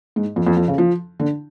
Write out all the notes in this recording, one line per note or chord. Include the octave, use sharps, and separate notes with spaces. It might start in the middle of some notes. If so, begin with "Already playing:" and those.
G#2
F2
F2
F2
C#3
F3
D3